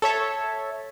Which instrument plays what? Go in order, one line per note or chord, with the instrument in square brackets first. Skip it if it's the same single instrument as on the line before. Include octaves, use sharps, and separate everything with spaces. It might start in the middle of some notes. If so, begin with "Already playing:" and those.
[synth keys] A4 C#5 E5